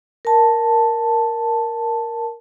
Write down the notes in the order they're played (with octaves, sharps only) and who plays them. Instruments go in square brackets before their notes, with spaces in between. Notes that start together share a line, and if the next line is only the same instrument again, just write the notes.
[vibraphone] A#4 A5